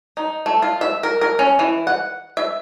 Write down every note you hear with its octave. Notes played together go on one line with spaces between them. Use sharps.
D#4
A3
F4
E5
A#4
A#4
C#4
E3
F#5
E5